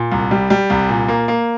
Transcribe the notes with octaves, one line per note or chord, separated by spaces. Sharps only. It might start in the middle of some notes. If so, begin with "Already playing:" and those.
Already playing: A#2
C2
G3
G3
C2
A#2
A#3
A#3